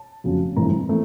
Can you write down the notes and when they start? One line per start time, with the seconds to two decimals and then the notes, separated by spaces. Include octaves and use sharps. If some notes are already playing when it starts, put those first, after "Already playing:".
Already playing: A5
0.24 F1 F2 C#3 F#3
0.56 G1 G2 E3 A3 C4 A#5
0.89 E3 A3 C4